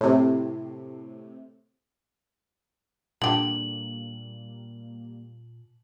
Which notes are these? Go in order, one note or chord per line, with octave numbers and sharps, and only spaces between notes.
A2 C3
A#2 D3 G3 A#3 G4 F#7